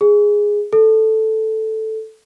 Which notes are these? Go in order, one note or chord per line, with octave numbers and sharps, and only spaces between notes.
G#4
A4